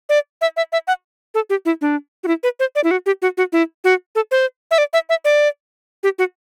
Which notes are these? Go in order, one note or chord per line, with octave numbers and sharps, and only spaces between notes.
D5
E5
E5
E5
F#5
A4
G4
E4
D4
F#4
E4
B4
C5
D5
E4
F#4
G4
F#4
F#4
E4
F#4
A4
C5
E5
D5
E5
E5
D5
G4
F#4